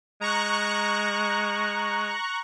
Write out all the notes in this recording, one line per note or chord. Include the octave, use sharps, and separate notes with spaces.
G#3 A#5 C#6 F#6